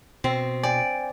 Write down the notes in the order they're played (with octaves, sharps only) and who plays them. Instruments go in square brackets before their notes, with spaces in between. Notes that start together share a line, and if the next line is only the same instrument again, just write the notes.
[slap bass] B2 [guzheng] C4
[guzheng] D5 [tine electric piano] G5 G#5